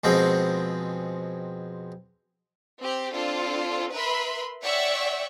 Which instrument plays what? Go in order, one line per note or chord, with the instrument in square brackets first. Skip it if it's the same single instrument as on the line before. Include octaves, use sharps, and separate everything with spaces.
[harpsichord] F2 B2 G#3 C4
[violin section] C4 G4
C4 D4 F4 A4
A#4 B4 E5 B5 C6
C#5 D5 E5 F#5 G5 C#6